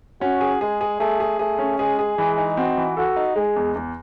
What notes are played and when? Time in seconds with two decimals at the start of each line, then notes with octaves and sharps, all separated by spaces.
0.21 C#4 F#4
0.41 G#4
0.61 G#3 G#4
0.81 G#4
1.00 A3 G#4
1.20 G#4
1.39 A3 G#4
1.59 C#4
1.78 G#3 G#4
1.99 G#4
2.18 E3 G#3
2.38 D#4
2.57 C4 F#4
2.77 E3
2.97 F#4 A4
3.16 D#4
3.36 G#3 G#4
3.56 E2
3.75 E2